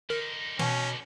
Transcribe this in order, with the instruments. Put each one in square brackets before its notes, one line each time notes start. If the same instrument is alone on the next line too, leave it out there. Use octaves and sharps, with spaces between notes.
[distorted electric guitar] D3 D#4 [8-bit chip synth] A#4
[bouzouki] B2 [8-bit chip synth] E3 [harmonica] C#4